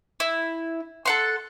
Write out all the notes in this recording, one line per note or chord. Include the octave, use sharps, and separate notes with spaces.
E4
A4 F#5 C6